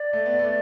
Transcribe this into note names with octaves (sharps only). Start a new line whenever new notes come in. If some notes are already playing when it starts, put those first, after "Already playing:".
Already playing: D5
A3
B3
A3